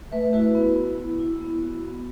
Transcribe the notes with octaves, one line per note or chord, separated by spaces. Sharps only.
A3 B4 E5
E4 F#4 B4
B3
B3
E4
E4
B3
F#4
B3